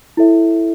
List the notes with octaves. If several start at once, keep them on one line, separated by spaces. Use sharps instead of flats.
E4 A4 C#5 E5